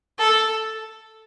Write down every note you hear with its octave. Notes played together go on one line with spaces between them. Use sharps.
A4